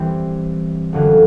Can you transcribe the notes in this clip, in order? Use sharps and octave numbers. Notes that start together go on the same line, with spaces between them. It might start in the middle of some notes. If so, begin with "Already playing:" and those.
Already playing: E3 G3 C4
F#1 F2 D3 F#3